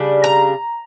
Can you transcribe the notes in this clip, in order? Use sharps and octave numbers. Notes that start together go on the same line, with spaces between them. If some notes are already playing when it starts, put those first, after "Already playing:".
Already playing: C#3 G3 D4
A#5